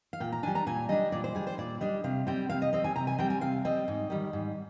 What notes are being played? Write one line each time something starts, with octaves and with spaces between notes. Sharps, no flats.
F5
A#2 G5
A#5
G3 D4 G#5
A#5
A#2 G#5
G3 D4 D#5
A#2 D5
C5
G3 D4 G#4
C5
A#2 D5
G3 D4 D#5
C3 F5
G3 C4 G5
C3 F5
D#5
G3 C4 D#5
G#5
C3 A#5
G#5
G3 C4 G5
G#5
C3 F5
G3 C4 D#5
G#2
D#3 G3
G#2